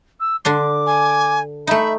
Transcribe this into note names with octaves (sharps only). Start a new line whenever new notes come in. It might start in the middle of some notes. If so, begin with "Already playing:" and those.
E6
D3 D4 C6 D6
G#5
A3 D#4 E5 B5